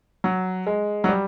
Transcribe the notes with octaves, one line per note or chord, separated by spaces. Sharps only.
F#3
G#3
F#3
G3